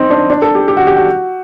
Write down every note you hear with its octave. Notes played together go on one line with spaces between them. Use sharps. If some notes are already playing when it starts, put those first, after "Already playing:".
Already playing: C4 D#4
D4
D4
A4
G4
G4
F#4
G4
F#4